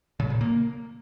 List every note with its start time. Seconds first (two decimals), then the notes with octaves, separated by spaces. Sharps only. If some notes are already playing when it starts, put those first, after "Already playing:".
0.20 C#3
0.30 A#2
0.41 A#3